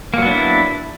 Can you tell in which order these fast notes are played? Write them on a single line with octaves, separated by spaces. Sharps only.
A#3 F#3 B3 D4 E4